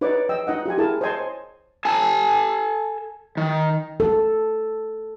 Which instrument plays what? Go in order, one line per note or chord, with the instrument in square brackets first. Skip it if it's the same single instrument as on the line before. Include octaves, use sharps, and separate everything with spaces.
[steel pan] D#4 B4 C#5 D5 D6
D#5 G5 E6
D#4 D#5 F#5
F4 G4 G#5
E4 G#4 A#4 A5
C5 C#5 D#5 G#5 A5 C6
[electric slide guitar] A4 G#5 A5
D#3
[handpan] A4